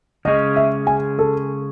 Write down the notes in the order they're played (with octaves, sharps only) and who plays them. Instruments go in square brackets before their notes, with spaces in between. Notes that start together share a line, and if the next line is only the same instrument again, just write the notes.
[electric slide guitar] C#3 G#3 C#4 G#4 [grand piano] D#5
[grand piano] E5
G#5
A4